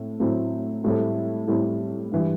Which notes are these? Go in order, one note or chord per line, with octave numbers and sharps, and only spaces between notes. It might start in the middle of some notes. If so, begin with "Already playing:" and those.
Already playing: A2 C4
A2 F#3 C4 E4
A2 G3 C4 E4 A4
A2 G3 C4 E4 A4
G2 E3 G3